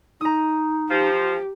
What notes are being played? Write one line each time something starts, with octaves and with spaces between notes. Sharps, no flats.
D#4 A#5 D#6
F3 G4